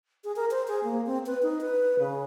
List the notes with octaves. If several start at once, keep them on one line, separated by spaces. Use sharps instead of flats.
G#4
A#4
C5
G#4
A#3
C4
B4
D#4
B4
C#3